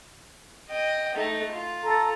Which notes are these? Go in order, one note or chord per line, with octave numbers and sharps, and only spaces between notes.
D#5 G5
A3 D#4
F4
A4 A#5